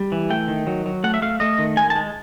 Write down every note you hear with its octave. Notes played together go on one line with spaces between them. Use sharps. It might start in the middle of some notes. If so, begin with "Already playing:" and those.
Already playing: G3
E3
A3 G5
D#3
F#3
F#3
A3 F#5
E5
A3 F5
A3 D#5
D#3
G#3 G#5
A5
G#3